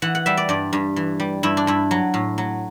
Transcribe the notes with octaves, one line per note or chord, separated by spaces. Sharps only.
E3 F#5
F#5
G3 E5
D5
G2 D5
G2
E3
G3
G2 E4
D4
G2 E4
F#3
A2
F#3